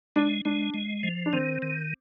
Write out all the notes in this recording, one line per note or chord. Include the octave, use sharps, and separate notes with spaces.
G#3 D4
G#3 D4
G#3
F3
D4
D#3 C4
D#3